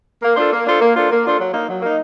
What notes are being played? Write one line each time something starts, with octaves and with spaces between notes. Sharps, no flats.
A#3
D4 F4 A4 C5
A#3
D4 F4 A4 C5
A#3
D4 F4 A4 C5
A#3
D4 F4 A4 C5
F#3
A#3 D#4
F#3
A#3 D#4